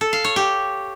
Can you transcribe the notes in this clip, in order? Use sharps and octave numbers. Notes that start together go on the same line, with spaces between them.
A4
F5
C#5
G4